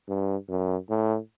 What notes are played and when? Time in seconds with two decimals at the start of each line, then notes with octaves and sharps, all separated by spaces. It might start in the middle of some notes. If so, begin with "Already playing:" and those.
0.08 G2
0.49 F#2
0.89 A2